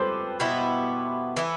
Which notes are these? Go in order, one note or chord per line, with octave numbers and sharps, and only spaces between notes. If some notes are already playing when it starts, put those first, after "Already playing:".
Already playing: F3 C4 G4 A4 B4 C5
B2 B3 E4 G4
E3 B3 E4